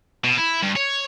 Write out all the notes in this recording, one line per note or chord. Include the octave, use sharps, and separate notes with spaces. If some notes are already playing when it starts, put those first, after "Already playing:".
B2
E4
G2
C#5